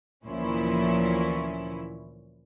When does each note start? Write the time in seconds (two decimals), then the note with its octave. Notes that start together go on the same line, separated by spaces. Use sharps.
0.23 D2 A#2 E3 F3 C#4 E4